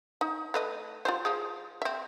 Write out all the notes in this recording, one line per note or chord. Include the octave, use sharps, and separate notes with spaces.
D#4
A3 B4 D#5
F4 G4 C5
F3 G#4
C4 E5